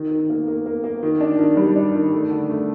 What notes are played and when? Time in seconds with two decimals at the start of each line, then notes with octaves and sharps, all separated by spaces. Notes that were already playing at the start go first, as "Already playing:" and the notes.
Already playing: D#3
0.11 D#3
0.30 A#3
0.48 A#3
0.66 A#3
0.84 A#3
1.03 D#3
1.21 D4
1.39 D#3
1.57 G3
1.75 D4
1.94 D#3
2.12 A3
2.30 D3
2.49 A3